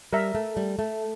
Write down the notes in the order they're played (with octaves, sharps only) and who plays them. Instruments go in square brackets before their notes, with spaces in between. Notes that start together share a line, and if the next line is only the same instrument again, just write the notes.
[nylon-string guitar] G3 [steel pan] A#4 E5 A#5
[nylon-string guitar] A3
G3
A3